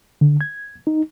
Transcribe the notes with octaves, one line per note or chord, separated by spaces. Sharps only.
D3
G#6
D#4